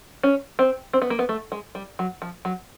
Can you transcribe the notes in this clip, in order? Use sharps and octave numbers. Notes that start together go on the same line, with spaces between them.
C#4
C4
C4
B3
A#3
B3
A3
G#3
G3
F#3
F3
F#3